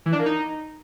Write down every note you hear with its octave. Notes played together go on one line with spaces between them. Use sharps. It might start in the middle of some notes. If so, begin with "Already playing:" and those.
E3
D4
A#3
D#4